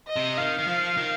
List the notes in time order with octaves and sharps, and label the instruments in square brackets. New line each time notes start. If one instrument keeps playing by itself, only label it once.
[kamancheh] D#5
[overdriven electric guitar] C3
[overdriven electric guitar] D#3 [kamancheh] F5
[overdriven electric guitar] D#3
F3
D#3